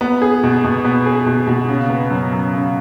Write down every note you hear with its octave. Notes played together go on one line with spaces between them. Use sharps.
B3
G#4
B2
B2
B3
G#4
B2
B2
C#3
B3
F#2
F#2
C#3